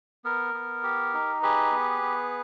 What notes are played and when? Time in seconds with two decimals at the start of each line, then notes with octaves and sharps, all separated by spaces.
0.24 B3 A#4
0.54 B3
0.83 G4
1.14 D#4
1.42 G4 G#4 B4
1.72 B3
2.02 B3